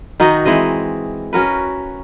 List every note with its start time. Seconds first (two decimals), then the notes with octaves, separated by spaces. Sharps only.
0.20 D#3 D#4 F#4 D#5
0.45 E3 G#3 C4 D#5
1.33 C#4 F#4 A#4 B4